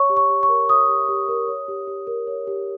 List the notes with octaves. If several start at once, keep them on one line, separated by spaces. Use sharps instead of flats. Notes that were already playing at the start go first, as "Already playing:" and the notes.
Already playing: C#5 C#6
G4
C#6
G4
C#6
A#4
C#5 D#6
G4
G4
A#4
C#5
G4
G4
A#4
C#5
G4